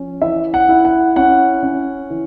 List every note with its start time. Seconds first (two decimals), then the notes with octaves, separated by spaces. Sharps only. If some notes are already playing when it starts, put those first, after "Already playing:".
Already playing: F3 C#4
0.22 E3 E5
0.54 F#5
0.69 E4
0.85 F#5
1.16 C#4 F#5
1.63 C#4
2.10 E3